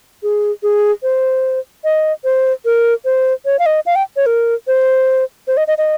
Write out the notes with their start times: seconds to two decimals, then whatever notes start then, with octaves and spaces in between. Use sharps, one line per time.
0.23 G#4
0.63 G#4
1.03 C5
1.84 D#5
2.24 C5
2.65 A#4
3.05 C5
3.46 C#5
3.59 F5
3.66 D#5
3.86 F5
3.96 G5
4.16 C#5
4.26 A#4
4.67 C5
5.48 C5
5.57 D#5
5.68 D#5
5.78 D#5